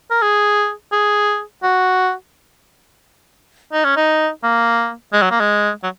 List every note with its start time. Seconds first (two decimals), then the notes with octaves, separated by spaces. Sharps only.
0.11 A#4
0.22 G#4
0.93 G#4
1.63 F#4
3.73 D#4
3.85 C#4
3.96 D#4
4.44 A#3
5.13 G#3
5.22 F#3
5.31 A#3
5.40 G#3
5.83 F#3